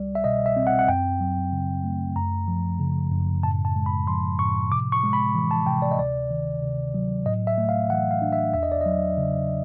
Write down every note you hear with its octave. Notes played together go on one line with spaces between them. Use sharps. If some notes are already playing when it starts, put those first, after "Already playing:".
Already playing: C2 G3 D5
E5
B2 D#5
E5
C4
F#5
F#5
F#2 G5
F#3
C#3
A3
F#2 A#5
F3
C#3
F#2
A2 A5
A5
G#3
B5
F3 C6
A2 C#6
C3 D6
C#6
G#3
B5
E3
A5
C3 G5
D5
D#5
D2 D5
D#3
C3
F#3
A2 D#5
E5
A3
F5
E3 F#5
F5
D4
E5
E2 E5
D#5
D5
F#3 D#5
C#3